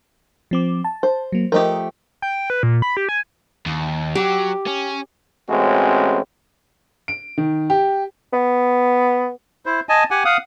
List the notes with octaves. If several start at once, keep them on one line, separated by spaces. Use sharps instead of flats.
F3 C4 D6
A5
C5
F#3 A#3
F3 A3 G4 A#4 D#5
G5
B4
A#2
B5
G4
G#5
D#2
F#3 G4
C#4
A1 G#3 C4 C#4 F#4
D7
D#3
G4
B3
E4 C5
D#5 G#5 A5
G4 F#5 G#5
F5 F#5 D#6